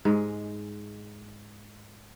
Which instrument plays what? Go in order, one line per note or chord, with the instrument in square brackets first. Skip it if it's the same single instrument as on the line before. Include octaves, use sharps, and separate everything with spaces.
[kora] G#2 G#3